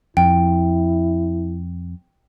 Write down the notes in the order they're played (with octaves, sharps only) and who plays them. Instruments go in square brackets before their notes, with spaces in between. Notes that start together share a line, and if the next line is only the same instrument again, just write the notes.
[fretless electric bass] F2 [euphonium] E4 [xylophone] G5